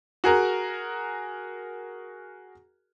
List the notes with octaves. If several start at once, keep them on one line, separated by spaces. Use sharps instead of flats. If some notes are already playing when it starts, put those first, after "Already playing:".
F#4 G#4 A#4